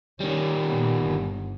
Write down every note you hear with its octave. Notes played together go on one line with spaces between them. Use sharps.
D#3 G3 C#4
A#2 B3
G1